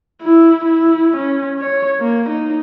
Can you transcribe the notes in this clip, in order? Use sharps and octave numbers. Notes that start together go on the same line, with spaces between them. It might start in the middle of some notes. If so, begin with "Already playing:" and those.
E4
E4
C#4
C#5
A#3
D#4